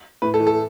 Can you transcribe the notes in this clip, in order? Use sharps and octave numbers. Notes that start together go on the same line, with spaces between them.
A2 B4
A4
E3
A4